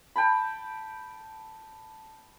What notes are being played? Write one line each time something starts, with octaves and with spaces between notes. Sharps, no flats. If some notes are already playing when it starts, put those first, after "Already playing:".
G5 A5 B5